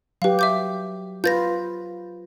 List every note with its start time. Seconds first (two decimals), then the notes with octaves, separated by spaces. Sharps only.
0.22 F#3 G4 B4 F5
0.39 E5 D6 G6
1.24 F4 B4 G6 A6 A#6